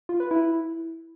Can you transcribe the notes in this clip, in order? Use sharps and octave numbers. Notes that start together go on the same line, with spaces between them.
F4
B4
E4